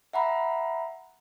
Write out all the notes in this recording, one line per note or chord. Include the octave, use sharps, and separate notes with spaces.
E5 F#5 A#5 B5